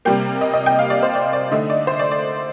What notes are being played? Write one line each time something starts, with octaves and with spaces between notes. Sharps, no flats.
C3 G3 A#3 G5
D#5
D#5
G5
F5
D5
C5
D5
D5
D3 A3 D#4 D#5
D5
C5
D5
D5